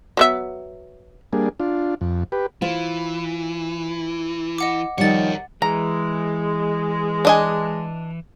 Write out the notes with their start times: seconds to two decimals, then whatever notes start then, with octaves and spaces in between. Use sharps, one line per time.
0.17 F#3 B3 E5
1.33 G3 A#3 D4 G#4
1.60 D4 F4
2.01 F2
2.32 G4 B4
2.62 E3 F4 C5
4.58 D#5 F#5 D6
4.98 D#3 F3 G3 A#4 C#5 F#5 A6
5.62 E3 G#3 A#5
7.25 D4 D#5 G#5